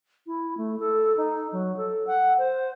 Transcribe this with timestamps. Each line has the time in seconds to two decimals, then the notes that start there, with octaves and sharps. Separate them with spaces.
0.27 E4
0.57 A3
0.79 A4
1.17 D#4
1.52 F#3
1.77 A4
2.07 F#5
2.38 C5